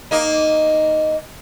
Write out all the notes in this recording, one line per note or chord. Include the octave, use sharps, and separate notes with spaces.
A#3 D#4